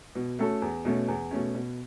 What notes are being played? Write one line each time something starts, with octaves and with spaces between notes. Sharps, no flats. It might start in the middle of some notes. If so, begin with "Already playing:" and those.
B2
A3 C#4 F#4 A4
E2
B2 A3 C#4
E2
B2 A3 C#4
B2